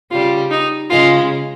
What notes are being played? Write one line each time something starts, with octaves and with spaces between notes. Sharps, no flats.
C#3 G3 F4
D#4
C#3 G#3 F4